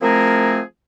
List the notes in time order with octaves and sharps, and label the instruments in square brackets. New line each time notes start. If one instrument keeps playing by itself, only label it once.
[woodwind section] F3 A3 C4 E4 G#4 A#4